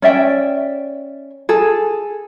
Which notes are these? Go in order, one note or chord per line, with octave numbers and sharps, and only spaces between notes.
C#4 D5 E5 G5
G#4 A4